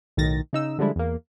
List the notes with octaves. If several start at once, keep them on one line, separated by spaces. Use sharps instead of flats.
B1 A2 D#3 A6 A#6
C#3 D#4 E6
D3 F3 G3 G#3 D4 E4
E2 A#3